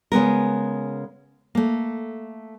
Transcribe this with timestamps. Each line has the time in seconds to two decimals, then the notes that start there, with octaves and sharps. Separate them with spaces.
0.12 C#3 G#3 B3 A#4
1.55 A3 A#3